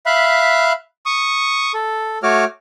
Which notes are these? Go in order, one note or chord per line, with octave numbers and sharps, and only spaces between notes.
E5 F5 B5 F#6
C#6 D#6
A4
A3 F#4 C#5 D6 F6